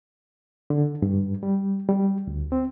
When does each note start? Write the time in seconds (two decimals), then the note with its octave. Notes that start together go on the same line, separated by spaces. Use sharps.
0.70 D3
1.02 G2
1.43 G3
1.89 G3
2.27 D2
2.52 C4